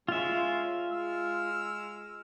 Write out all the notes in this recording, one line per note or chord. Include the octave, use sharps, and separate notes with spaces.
G#3 C#4 F4 E5
G#3 E6 F6